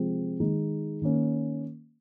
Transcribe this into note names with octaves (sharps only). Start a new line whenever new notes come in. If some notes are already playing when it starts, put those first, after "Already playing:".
Already playing: C3 F3 G#3 C4
D#3 G#3 D#4
D#3 A#3 C#4